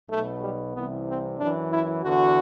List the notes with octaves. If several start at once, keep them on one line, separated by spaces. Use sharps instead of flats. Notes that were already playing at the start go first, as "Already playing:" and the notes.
B1 B2 A3
G3
C2 C3 E3 B3
C4
F#2 E3 D4
E4
E2 D3 F#4